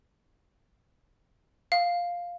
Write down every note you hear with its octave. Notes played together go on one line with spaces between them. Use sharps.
F5